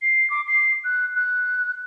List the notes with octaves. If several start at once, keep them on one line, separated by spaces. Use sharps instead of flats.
C7
D6
C7
F#6
F#6